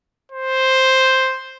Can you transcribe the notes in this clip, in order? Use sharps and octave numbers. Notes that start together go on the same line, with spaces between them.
C5